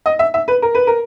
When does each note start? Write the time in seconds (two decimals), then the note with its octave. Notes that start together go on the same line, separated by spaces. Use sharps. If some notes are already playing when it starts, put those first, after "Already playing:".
0.06 D#5
0.19 E5
0.34 E5
0.48 B4
0.62 A#4
0.75 B4
0.87 A#4